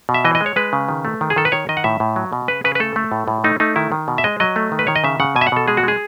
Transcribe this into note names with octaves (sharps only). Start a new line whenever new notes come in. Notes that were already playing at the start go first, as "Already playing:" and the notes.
B2
E5
E3 D#5
D#5
G#3
C#5
G#3 B4
C#3
D#3
A3
D#3
G#4
D#3 A4
B4
D#3 C#5
D#3 D#5
F#5
A2 E5
A2
F#3
B2
C#3 B4
C#3 B4
B4
A3 A4
A3
A2
A2
A3 D#4
A3 D#4
D#3 E4
D#3
B2
E5
G#3 D#5
F#3 D#5
A3
D#3
B4
D#3 C#5
D#5
C#3 E5
C#3 F#5
B2 G#5
E5
F#5
B2 A4
G#3 G#4
F#4
G#3 G#4